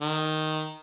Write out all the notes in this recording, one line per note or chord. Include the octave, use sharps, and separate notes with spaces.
D#3